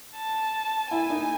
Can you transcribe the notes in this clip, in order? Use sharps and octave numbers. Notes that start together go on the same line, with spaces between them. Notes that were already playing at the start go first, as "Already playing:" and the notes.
A5
E4 G#5
D#4